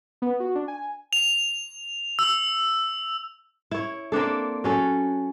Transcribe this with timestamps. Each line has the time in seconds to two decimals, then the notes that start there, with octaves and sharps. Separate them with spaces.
0.22 B3
0.40 F#4
0.55 D4
0.68 G#5
1.13 F7
2.19 E6
3.71 E4 C#5
4.12 A#3 C4 D4 A4
4.64 F#3 C#4 A4